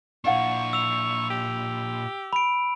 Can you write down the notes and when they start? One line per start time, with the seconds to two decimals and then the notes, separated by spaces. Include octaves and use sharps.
0.25 A#2 D4 E4 F5 F#5 C#6
0.73 E6 F7
1.30 G4
2.33 B5 D7